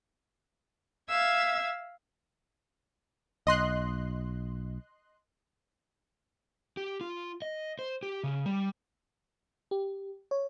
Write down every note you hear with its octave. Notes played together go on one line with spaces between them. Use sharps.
E5 F5 E6 G#6
B1 D#5 C6 F#6
G4
F4
D#5
C5
G4
C#3
G3
G4
C#5